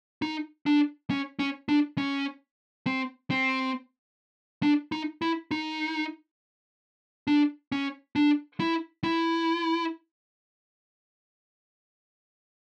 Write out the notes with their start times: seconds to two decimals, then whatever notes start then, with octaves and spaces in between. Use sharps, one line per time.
0.22 D#4
0.66 D4
1.10 C#4
1.39 C#4
1.69 D4
1.98 C#4
2.87 C4
3.31 C4
4.63 D4
4.92 D#4
5.22 E4
5.51 D#4
7.27 D4
7.72 C#4
8.16 D4
8.60 E4
9.04 E4